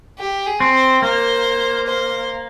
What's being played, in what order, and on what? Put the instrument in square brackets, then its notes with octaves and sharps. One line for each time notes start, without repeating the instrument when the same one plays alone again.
[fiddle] G4
G#4
[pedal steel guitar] C4
[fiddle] C5
[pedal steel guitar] A#3 [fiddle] C5
[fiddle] C5